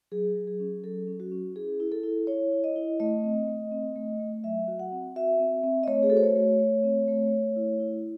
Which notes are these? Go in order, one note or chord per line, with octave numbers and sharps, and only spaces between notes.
F#3 G#4
F#3
G#4
C#4
F#3 A4
C#4
F#4
C#4
E4 G#4
E4
A4
E4
E4 C#5
E4
D#5
E4
A3 D#5
C4
A3
C4
A3
A3
F#3 E5
F#4
F#5
C4
F#4 E5
C4
C4
D#5
A3 C#5
G#4
F#4 A4
C5
C#5
A3
A3
C4
A3
A3
E4
E4